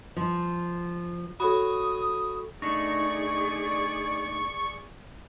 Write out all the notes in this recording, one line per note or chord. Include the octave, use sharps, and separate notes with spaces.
F3
F#4 A4 C#5 B5 D#6
A3 D4 D#4 G#4 D5 C#6